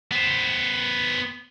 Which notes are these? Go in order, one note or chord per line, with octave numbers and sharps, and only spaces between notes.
B3 C5